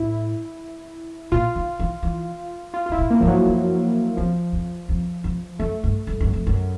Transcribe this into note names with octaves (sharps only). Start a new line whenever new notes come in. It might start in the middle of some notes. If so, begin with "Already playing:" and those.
Already playing: A2 E4
A#2 F4
D#3
E3
E3
F4
F4
G#2 E4
A2
A#3
G#2 F3
F#3
F#2
F2 F3
F2
F2
F2
F#2 A3
G2
G2
F#2
F2
F#2